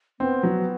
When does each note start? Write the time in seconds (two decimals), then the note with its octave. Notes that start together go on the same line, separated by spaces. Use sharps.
0.20 B3 C4
0.43 F#3